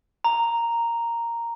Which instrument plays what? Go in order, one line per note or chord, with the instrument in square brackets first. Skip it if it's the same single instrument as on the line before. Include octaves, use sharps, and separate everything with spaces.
[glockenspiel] A#5